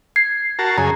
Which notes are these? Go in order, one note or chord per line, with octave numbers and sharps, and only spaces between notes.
G#6 C7
F#4 A#4 A5
F#2 C#3 G#4 A#5